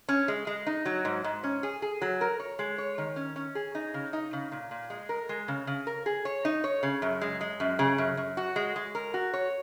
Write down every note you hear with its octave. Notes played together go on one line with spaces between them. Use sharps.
C#4
G#3
G#3
D#4
F#3
G#2
G#2
C#4
G#4
G#4
F#3
A#4
C#5
G#3
C#5
D#3
C#4
C#4
G#4
D#4
C#3
D#4
C#3
A#2
A#2
G#3
A#4
G#3
C#3
C#3
A#4
G#4
C#5
D#4
C#5
C#3
F#2
G#3
G#3
F#2
C#3
F#2
F#2
F#4
G#3
G#3
A#4
F#4
C#5